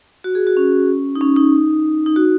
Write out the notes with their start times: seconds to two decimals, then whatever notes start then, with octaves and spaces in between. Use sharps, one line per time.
0.24 F#4
0.35 G#4
0.47 F#4
0.57 C#4
1.15 D#4
1.21 C#4
1.36 D#4
2.06 D#4
2.16 F#4